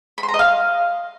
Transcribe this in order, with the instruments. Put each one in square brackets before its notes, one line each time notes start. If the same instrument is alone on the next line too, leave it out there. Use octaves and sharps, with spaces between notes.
[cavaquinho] B5
C6
A#5
D#5
F5